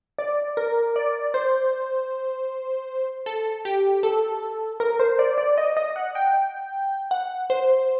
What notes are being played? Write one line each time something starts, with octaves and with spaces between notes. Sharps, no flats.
D5
A#4
D5
C5
A4
G4
A4
A#4
C5
D5
D5
D#5
D#5
F#5
G5
F#5
C5